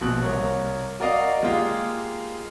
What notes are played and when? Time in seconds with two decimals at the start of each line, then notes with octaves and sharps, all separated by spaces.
0.01 A#1 B2 F#6
0.22 C2 A#4 C#5
1.00 F#4 A#4 D5 D#5 F5
1.43 G#3 A#3 F4 G4